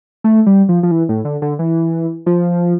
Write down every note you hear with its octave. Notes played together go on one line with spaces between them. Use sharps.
A3
G3
F3
F3
E3
A2
D3
D3
E3
F3